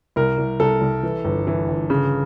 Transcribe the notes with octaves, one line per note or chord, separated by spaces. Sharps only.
C2 A#4
C2
C2 A4
C2
E3
G1
E3
G1
C#3